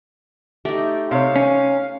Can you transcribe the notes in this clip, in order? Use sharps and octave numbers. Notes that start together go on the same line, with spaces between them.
A3 D#4 G4
C3 C#5 F5
C#4